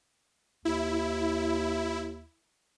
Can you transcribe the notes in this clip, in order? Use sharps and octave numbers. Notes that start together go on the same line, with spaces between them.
D#2 E4